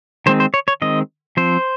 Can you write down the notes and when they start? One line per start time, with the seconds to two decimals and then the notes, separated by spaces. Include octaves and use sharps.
0.26 D#3 G#3 C4 C5
0.40 C5
0.54 C#5
0.68 C#5
0.82 D#3 G#3 C4 D#5
1.37 F3 C4 C5